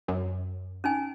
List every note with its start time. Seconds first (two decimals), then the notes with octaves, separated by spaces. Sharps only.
0.08 F#2
0.84 C#4 D#4 G#5